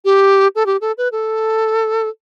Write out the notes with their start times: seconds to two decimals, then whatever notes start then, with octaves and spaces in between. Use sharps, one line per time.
0.05 G4
0.55 A4
0.66 G4
0.81 A4
0.98 B4
1.12 A4